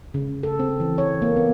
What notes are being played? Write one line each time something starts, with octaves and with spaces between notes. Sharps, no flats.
C#3
A4
C4
E3
C#5
A#3
B3